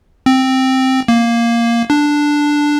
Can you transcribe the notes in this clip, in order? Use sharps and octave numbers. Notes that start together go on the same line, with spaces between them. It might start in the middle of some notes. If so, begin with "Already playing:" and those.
C4
A#3
D4